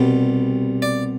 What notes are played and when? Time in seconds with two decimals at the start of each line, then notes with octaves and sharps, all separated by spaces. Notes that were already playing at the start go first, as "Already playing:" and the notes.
Already playing: C2 B2 G3
0.82 D5